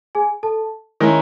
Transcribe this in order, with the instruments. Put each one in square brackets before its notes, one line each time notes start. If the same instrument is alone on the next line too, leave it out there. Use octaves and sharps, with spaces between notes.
[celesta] G#4 G#5
A4 A5
[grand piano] D#3 G#3 C#4 E4 [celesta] A#4 A#5